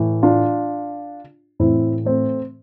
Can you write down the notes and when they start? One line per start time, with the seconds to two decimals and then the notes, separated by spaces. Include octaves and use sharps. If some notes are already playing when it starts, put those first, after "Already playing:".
Already playing: A2 E3
0.23 D4 F4
1.60 A2 E3 C4 E4
2.05 A3 C4